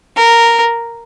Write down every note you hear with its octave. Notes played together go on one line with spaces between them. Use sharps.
A#4